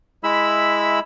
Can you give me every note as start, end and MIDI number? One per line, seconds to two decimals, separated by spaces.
0.24 0.99 56
0.24 0.99 64
0.24 0.99 76
0.24 0.99 83
0.24 0.99 88